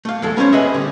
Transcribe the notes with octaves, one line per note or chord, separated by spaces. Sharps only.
A3 F5
E2 G#3 A4
B3 C#4 A#4 C5 C#5
G#4 B4 D#5 E5
D3 G3